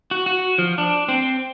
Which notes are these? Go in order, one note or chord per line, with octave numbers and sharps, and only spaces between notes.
F#4
F#4
F3
D4
C4